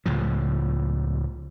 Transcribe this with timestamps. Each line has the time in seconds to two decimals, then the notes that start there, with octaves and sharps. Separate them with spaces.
0.06 C#2 A2 F3